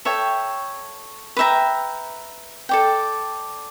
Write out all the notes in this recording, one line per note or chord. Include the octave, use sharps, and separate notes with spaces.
A4 C#5 E5 G5
B4 E5 G5 A#5
A4 D5 G5